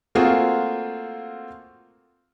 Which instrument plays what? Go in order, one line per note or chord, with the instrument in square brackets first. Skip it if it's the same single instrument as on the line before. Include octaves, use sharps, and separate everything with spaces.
[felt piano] A3 A#3 C4 F4 F#4 G#4